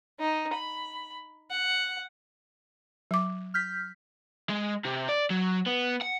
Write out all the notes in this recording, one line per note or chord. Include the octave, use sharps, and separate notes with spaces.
D#4
B5
F#5
F#3 D6
F6 G6 B6
G#3
C3
D5
F#3
B3
F#5